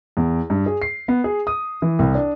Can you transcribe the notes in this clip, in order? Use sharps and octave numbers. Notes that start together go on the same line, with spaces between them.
E2
G2
G#4
C7
B3
G#4
D#6
E3
C2
D4